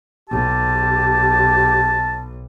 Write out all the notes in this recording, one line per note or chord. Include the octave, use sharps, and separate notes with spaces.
B1 G4 A5